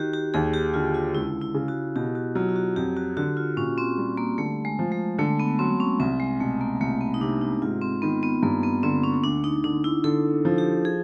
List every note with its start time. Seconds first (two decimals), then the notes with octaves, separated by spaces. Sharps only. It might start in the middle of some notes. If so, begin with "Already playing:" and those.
Already playing: D#3 F#4 G4
0.13 G4
0.34 D#2 G#4
0.54 G4
0.74 D3 F4
0.94 F4
1.14 C#2 E4
1.42 E4
1.54 C#3
1.68 F#4
1.96 B2 G4
2.15 F#4
2.35 F#3 F4
2.49 F4
2.56 F#4
2.76 F2 G4
2.97 F#4
3.17 D3 F#4
3.37 F4
3.57 A#2 C#4
3.78 C4
3.98 G3
4.17 A#3
4.38 D3 A3
4.65 G#3
4.79 F3
4.92 G#3
5.18 D3 A3
5.40 B3
5.59 F#3 C4
5.80 C#4
5.99 C2 C4
6.20 G#3
6.40 B2 A3
6.61 A#3
6.80 C2 A3
7.01 B3
7.14 D#4
7.21 C3 D4
7.41 D#4
7.62 G#2 F4
7.82 C4
8.02 D#3 B3
8.23 B3
8.43 G2 A#3
8.63 B3
8.83 D3 C4
9.03 C#4
9.23 D2 D4
9.44 D#4
9.64 D3 D4
9.84 E4
10.04 D3 A4
10.45 F3
10.58 G4
10.85 G#4